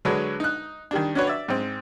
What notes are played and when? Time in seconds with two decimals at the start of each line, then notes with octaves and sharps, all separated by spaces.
0.05 D3 F#3 G#3 D4 B4 C#5
0.40 D#4 F#6
0.91 D#3 G3 D4
1.15 C#4 D4 F#4 B4 C#5
1.27 D5 E5
1.48 G#2 C4